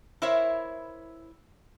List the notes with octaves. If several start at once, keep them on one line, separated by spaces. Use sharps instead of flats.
E4 A#4 C5 C#5 E5